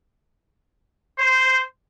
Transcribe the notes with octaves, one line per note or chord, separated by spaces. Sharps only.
C5